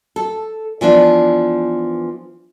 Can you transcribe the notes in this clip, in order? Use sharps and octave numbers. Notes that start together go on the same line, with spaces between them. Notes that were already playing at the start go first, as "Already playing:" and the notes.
A4
E3 F3 B3 D4